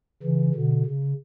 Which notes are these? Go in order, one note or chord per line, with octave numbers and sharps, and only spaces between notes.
C#3 E3
B2 D3
C#3